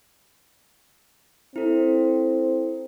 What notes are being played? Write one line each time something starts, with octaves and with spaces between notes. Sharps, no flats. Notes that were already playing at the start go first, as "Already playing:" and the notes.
C4 E4 A4